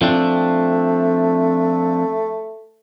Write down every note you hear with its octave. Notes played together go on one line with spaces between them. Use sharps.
F3 A3 C4 D4